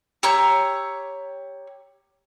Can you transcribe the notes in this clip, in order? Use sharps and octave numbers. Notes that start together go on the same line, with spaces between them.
G4 C#5 A#5 E6